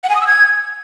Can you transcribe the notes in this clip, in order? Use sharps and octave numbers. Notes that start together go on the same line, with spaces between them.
F#5
G#5
D#6
E6
G#6